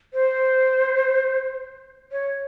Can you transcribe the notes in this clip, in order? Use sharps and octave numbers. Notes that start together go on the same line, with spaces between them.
C5
C#5